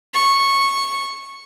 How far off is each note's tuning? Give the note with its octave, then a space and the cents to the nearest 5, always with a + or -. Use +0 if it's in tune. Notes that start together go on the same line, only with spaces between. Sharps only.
C#6 -10